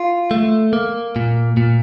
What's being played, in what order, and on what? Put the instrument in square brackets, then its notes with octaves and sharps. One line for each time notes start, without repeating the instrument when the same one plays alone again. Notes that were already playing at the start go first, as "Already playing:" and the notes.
Already playing: [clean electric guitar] F4
A3
A#3
A#2
A#2